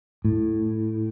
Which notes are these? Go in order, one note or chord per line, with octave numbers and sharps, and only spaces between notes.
A2